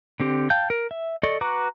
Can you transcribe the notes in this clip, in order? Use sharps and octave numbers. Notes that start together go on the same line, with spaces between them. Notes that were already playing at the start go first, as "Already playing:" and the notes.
D3 C4 G4
F5 G5 A5 G6
A#4
E5
A4 D5 D#5 C#6
F#4 B4 A#5 C#6 D6